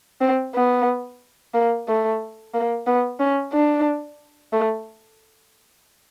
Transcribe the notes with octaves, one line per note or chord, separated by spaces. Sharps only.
C4
B3
A#3
A3
A#3
B3
C#4
D4
A3